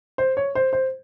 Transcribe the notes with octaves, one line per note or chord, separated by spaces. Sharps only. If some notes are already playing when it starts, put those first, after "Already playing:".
C5
C#5
C5
C5